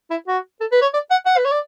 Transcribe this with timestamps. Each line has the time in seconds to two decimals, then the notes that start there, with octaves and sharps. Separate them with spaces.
0.11 E4
0.28 F#4
0.61 A4
0.72 B4
0.82 C#5
0.93 D5
1.11 F#5
1.26 F#5
1.37 B4
1.45 C#5
1.52 D5